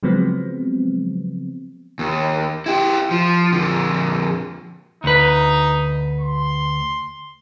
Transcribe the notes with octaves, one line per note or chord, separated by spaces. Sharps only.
C#3 F3 F#3 G#3 B3 C4
D#2
E4 G4
F3
F2 D3
D2 D#4 B4
C6